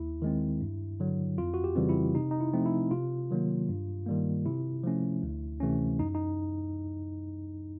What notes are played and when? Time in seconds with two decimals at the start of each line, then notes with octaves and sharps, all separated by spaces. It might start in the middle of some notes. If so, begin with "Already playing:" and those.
Already playing: D#2 E4
0.22 D#3 G#3 C4
0.61 G2
1.00 D3 F#3
1.38 F2 F4
1.54 F#4
1.64 G4
1.76 C#3 E3 G3 C4
1.89 E4
2.15 C3 D#4
2.31 D#4
2.40 E4
2.53 F3 A3 C4
2.66 E4
2.91 C3 F4
3.31 D#3 F#3 A#3
3.69 G2
4.07 D#3 G3 A#3
4.46 C3 E4
4.83 F3 A3 C#4
5.23 D2
5.60 C3 E3 A3 C#4
5.99 F#2 D#4
6.15 D#4